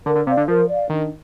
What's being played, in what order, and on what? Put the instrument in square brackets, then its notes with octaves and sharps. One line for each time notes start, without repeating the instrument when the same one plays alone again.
[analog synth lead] D3 [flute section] A#4
[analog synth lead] D3
[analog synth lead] C3 [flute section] D5 F5
[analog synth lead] D3
[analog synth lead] F3 [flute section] A#4
[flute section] D5 F5
[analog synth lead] D#3 [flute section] D4